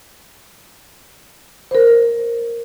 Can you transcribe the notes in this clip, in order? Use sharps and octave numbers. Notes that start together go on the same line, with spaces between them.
A#4 C5